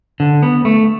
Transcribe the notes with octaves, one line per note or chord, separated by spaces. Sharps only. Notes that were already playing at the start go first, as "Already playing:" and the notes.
D3
B3
A3